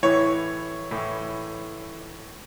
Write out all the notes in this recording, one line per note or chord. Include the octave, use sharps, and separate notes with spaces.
A2 E3 C#5
A2 E3